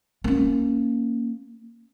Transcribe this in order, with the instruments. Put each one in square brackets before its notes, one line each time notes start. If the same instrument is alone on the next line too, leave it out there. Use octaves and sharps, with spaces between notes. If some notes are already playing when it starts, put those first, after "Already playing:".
[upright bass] A#3 C#4